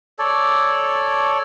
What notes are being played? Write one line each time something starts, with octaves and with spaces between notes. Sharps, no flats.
A4 C#5 D5